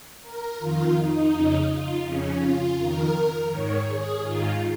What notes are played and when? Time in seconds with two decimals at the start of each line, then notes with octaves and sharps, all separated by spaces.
0.22 A#4
0.59 F2 D#3 F4
0.95 D#4
1.31 F2 C#3
1.68 F4
2.04 F2 C#3 C#4
2.40 F4
2.77 F2 D#3 A#4
3.49 G#2 D#3 C#5
3.86 G#4
4.22 G#2 D#3 F4